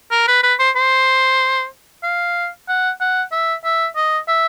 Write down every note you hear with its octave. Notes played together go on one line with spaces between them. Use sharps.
A#4
B4
B4
C5
C5
F5
F#5
F#5
E5
E5
D#5
E5